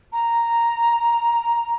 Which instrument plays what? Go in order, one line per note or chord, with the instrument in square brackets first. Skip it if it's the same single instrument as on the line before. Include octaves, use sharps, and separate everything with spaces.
[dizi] A#5